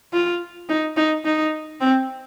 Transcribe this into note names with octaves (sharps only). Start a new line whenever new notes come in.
F4
D#4
D#4
D#4
C4